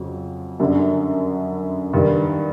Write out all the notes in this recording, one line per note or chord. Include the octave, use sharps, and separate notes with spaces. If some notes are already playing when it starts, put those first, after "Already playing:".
Already playing: F2 C#3 F#3
F#2 D3 G3
G2 D#3 G3